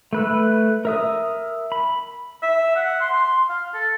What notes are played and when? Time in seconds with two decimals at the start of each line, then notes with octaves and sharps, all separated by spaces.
0.13 A3 B4 E6
0.85 A#4 E5 D#6
1.72 B5
2.43 E5
2.76 F#5
3.01 C6
3.13 C6
3.49 F5
3.74 A4